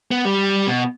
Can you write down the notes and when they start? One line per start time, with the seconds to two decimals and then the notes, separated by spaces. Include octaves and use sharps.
0.11 B3
0.25 G3
0.67 B2